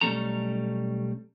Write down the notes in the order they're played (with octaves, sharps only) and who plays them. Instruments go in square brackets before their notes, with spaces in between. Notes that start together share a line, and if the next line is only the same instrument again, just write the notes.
[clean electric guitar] B1 G3 A3 C#4 A4 A#5